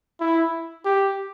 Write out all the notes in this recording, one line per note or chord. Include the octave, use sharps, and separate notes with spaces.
E4
G4